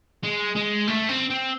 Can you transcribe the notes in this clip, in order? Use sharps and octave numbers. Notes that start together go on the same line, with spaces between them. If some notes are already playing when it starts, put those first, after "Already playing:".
G#3
G#3
A3
C4
C4